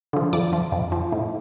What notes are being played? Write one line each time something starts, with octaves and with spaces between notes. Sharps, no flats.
D3 F3
F2 D5
F3
F2
F3
A2